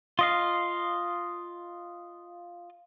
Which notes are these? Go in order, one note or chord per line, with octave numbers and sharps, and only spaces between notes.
F4 D#5 F5